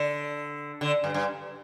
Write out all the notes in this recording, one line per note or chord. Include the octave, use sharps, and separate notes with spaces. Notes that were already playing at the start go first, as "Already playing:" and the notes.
Already playing: D3
D3
G2
G2